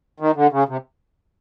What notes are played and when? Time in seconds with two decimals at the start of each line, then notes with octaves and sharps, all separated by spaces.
0.20 D#3
0.36 D3
0.52 C#3
0.69 C3